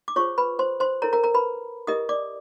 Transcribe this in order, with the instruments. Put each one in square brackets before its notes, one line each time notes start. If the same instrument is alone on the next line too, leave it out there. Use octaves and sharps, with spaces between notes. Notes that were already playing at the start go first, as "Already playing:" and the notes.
[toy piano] D6
F4 G#4 C5 C#5 C#6
B4 B5
C5 C6
C5 C6
E4 A4 A#4 C#5 A#5
A#4 A#5
A#4 A#5
B4 B5
E4 G4 A#4 D#5 D#6
D5 D6